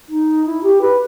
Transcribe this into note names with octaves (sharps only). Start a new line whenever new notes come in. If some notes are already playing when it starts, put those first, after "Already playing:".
D#4
E4
G4
B4